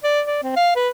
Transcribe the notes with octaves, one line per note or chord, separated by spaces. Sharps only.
D5
D5
C4
F5
B4